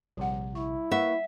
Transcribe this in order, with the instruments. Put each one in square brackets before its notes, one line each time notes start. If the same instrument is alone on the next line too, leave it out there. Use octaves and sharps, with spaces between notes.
[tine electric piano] A#1 C3 [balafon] G3 F#5
[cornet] E4 [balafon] C#6
[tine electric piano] A#3 B4 C#6 [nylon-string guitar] E5 [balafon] F#5